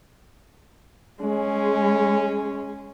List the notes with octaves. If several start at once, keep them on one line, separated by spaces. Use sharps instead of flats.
G#3 C#4